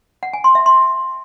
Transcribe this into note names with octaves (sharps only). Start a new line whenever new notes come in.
F#5
G#5
C6
E5
C6